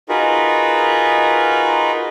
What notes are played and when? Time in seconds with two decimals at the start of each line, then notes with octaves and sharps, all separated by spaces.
0.09 D#4 F4 F#4 G#4 A#4 B4